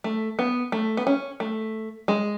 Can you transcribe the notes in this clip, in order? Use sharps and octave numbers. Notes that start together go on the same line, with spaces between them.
A3
B3
A3
B3
C#4
A3
G#3